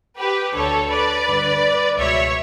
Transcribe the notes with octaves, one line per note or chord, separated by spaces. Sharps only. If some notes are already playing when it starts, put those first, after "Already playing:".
G4 B4
D2 D3 A4 C#5
B4 D5
G2 D3
C#2 B2 C#5 E5